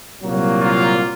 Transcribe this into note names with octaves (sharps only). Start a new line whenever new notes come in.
C2 A#2 F#3 A#3
F4